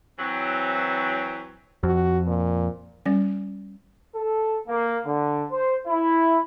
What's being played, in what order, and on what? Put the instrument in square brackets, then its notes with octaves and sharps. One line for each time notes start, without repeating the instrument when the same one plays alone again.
[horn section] E3 F#3 C4
[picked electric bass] F2 [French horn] F#4
[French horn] A#2
[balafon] G3 C#4
[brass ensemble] A4
A#3
D3
C5
E4